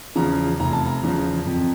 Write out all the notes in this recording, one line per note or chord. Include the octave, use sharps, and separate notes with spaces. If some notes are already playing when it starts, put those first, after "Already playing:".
E2 C#3 F3 A#5
F1 A#5
A5
A#5
E2 C#3 F3
F2